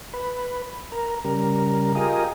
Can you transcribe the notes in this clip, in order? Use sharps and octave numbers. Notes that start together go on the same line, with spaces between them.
B4
A#4
C#3 G3 A#4
F4 G4 G#4 A#4 D#5